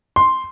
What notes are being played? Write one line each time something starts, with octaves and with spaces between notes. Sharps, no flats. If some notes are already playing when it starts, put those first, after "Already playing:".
C6